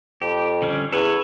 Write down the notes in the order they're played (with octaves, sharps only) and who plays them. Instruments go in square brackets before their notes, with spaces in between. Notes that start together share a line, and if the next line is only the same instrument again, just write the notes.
[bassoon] F2 [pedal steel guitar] G4
[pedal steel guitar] D3 G3 C#4
[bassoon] E2 [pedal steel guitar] A4 B4 C#5